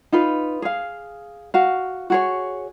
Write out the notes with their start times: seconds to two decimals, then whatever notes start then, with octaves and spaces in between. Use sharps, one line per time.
0.12 D#4 F4 B4
0.62 G#4 F5
1.54 F#4 F5
2.10 F#4 G#4 C#5